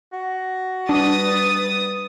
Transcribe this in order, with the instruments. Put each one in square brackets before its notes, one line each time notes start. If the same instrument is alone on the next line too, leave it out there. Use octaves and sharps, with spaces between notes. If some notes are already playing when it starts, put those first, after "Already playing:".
[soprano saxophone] F#4
[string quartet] G3 B4 A6 [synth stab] D4 [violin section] D#6